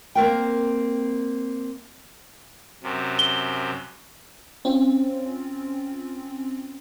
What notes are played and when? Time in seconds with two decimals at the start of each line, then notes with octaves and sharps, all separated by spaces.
0.15 A#3 C4 A#4 G5
2.83 F#2 C3
3.19 G7
4.65 C4 C#4 F4